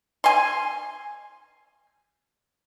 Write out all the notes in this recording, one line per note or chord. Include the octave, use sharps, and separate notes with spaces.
G#5 C6